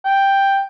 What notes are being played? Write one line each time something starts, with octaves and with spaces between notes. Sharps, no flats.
G5